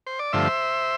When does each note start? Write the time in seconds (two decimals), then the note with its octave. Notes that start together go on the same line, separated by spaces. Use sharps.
0.07 C5
0.19 D5
0.33 G2 D3 F3 A3 C5 E5